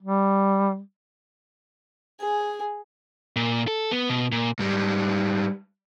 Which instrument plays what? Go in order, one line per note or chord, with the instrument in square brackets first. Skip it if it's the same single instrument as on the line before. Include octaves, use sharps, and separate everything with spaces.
[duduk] G3
[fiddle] G#4 [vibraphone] G#5
[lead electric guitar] A#2
A4
B3
B2
A#2
[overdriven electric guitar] G#2 G3